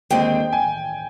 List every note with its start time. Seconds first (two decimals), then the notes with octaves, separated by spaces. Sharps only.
0.11 D#2 D3 G#3 C4 G5
0.53 G#5